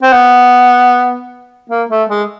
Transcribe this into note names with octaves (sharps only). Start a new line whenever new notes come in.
C4
B3
A#3
A3
G#3